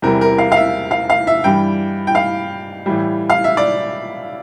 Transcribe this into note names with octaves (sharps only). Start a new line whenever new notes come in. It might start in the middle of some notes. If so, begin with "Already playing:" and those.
E2 C3 E3 G3 A#4
A#4
F5
F5
E5
F5
F5
E5
G2 E3 G3 G5
G5
F5
A2 E3 G3
F5
E5
D5